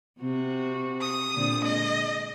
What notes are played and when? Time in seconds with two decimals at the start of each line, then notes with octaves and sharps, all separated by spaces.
0.19 C3 C4 F#4
1.02 D#6
1.35 A#2 D3 C4
1.64 G#3 D#5